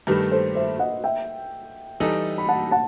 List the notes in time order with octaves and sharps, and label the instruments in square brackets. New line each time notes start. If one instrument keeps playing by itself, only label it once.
[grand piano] G2 D#3 A3 [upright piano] G4 B4
[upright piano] A4 C5
C5 E5
D#5 F#5
E5 G5
[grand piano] E3 G3 D#4 A4
[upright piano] B5
F#5 A5
F#5 A5